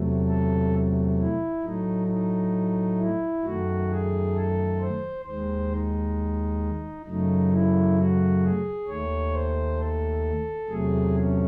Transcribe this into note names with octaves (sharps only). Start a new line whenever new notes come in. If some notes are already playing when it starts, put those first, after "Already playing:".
Already playing: E2 C3 F#3 A3
A4
E4
A2 F#3 A3 D#4
D#4
E4
F#2 D#3 A3 F#4
G#4
A4
C5
D#2 D#3 G#3 C5
D#4
F#2 C#3 F#3 A3 D#4
E4
F#4
G#4
D#2 D#3 A3 C#5
C5
A4
E2 C3 F#3 A3 G#4
C#4